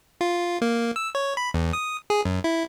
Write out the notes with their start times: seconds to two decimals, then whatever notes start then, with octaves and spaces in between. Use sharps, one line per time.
0.21 F4
0.62 A#3
0.96 E6
1.15 C#5
1.37 B5
1.54 E2
1.73 D#6
2.10 G#4
2.25 F#2
2.44 E4